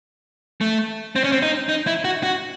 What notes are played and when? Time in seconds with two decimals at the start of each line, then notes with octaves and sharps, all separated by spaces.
0.61 A3
1.16 C4
1.24 C#4
1.32 C4
1.42 D#4
1.69 D#4
1.87 E4
2.04 F#4
2.23 F#4